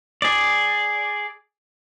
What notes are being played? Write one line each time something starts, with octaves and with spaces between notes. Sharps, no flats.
G#4 D5